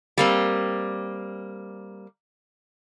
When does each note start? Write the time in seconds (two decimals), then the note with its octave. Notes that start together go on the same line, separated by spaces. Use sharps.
0.18 G3 A#3 C4